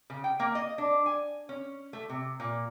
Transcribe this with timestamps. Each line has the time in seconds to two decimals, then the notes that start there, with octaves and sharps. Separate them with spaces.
0.10 C#3
0.24 G5
0.40 A#3
0.55 D#5
0.78 D4
1.06 G#5
1.49 C#4
1.93 A3
2.10 C3
2.40 A#2